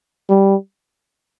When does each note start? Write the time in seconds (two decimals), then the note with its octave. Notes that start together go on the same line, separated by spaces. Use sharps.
0.29 G3